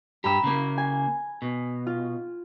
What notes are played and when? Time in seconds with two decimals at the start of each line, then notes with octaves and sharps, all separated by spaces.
0.24 G2 G4 A#5 B5 E6
0.44 C#3 A#3
0.78 G#5
1.42 B2
1.86 F4